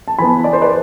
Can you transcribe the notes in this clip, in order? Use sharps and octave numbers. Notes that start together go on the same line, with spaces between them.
A5
E3 B3 G#5 B5
D5
C5
B4 D5